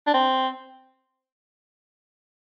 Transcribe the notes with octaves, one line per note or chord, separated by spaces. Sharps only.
D4
C4